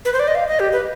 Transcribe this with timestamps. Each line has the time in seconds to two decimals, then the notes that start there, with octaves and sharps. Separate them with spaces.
0.05 B4
0.14 C5
0.20 D5
0.28 D#5
0.35 F5
0.48 D#5
0.60 G4
0.72 B4